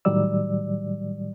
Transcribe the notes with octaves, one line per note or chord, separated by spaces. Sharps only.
A2 D#3 F#3 G3 D5 E6